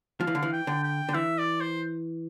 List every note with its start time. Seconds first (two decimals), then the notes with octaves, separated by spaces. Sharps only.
0.20 F3 F5
0.27 E3
0.35 D3
0.43 E3
0.52 G5
0.67 D3
0.83 G5
1.09 D3
1.14 E3 E5
1.38 D5
1.61 C5